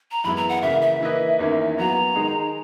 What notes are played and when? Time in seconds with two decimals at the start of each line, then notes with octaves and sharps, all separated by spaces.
0.11 A#5
0.24 F#2 E3 G#3 B3 E4 B5
0.37 A#5
0.49 F#5
0.62 C#3 E3 A#3 E5
0.81 E5
1.01 E3 A#3 E4 B4 D#5
1.39 E2 D#3 A#3 C#4 E4
1.77 F#3 B3 F#4 A#5
2.16 D#3 G#3 D#4 G#4